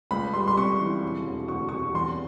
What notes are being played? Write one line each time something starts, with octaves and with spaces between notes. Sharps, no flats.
C#2 B5
G3 C6
C6
C3 C#6
E3
E1
E1
D2 C#6
C3 C#6
E2 C6